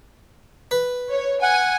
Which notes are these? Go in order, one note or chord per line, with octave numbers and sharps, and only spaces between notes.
B4
C#5
F#5 G#5